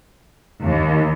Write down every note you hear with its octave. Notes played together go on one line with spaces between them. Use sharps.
D#2